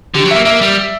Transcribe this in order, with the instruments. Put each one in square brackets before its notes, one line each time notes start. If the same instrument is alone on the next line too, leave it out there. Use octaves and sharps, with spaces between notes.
[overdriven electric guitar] D3 [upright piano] G4
[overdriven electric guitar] F#3
[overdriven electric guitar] A#3 [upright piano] E5
[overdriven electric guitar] A#3 [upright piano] E5
[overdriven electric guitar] G3